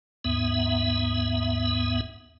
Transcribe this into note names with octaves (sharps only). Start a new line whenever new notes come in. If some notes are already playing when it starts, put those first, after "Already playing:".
D#2 G#2 B3 E5